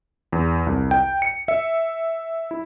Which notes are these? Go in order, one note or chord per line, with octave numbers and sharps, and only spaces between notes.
E2
C2
G5
C#7
E5
E4